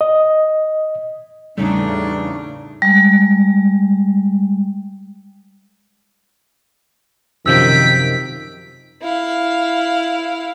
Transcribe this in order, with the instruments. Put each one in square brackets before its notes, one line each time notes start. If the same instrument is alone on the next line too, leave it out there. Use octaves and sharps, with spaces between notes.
[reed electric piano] D#5
[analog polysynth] E2 C#3 A3 [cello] A2 D4 [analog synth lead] G3 [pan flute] D#4
[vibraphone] G3 G#3
[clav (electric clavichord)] F#2 C3 F3 [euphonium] D#3 [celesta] E6 G6 [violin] B6 D7
[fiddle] E4 F5